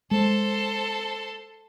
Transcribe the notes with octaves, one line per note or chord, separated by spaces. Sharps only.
G#3 A4 C5